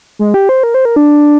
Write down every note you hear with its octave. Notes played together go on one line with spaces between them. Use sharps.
G#3
G4
C5
A#4
C5
A#4
D4